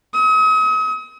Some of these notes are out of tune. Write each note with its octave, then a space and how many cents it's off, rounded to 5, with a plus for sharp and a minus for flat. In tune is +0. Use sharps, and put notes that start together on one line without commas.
D#6 +40